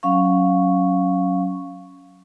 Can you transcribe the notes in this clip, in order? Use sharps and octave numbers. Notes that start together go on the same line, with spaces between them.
F#3 C#4 F5 C#6